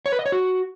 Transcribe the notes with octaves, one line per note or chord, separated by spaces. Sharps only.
C#5
B4
D#5
C#5
F#4